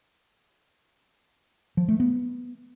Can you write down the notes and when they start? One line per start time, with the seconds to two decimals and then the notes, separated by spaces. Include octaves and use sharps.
1.77 F3
1.89 A3
2.00 B3